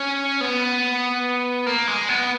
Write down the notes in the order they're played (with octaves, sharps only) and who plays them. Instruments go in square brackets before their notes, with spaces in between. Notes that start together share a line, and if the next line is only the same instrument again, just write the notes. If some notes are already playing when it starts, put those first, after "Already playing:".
Already playing: [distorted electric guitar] C#4
B3
A#3
G#3
B3